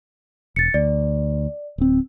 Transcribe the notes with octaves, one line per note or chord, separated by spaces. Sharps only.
E1 A6 C#7
D2 D5
D1 C4